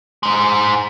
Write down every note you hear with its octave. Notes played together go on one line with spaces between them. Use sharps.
G#2 G#3